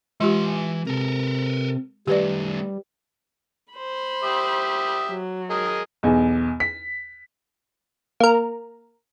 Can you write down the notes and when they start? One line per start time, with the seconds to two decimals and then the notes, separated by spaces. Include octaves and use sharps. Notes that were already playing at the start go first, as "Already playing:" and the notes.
0.20 E3 G#3 F4 G4 C6
0.87 C3 A4 A#4
2.07 D#3 G3 A3 G4 B4 D5
3.73 C5 B5
4.23 G4 E5 D#6
5.09 F#3
5.50 G#4 A#4 D#5
6.03 B1 E2
6.60 B6
8.20 A#3 A#4